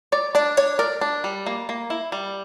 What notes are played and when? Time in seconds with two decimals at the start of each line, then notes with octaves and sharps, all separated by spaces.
0.12 C#5 D5
0.35 D4 D5
0.57 D4 C#5
0.79 A#4 D5
1.01 D4
1.24 G3
1.47 A#3
1.69 A#3
1.90 E4
2.12 G3